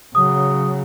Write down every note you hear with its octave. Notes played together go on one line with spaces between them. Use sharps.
C#3 F#3 D#6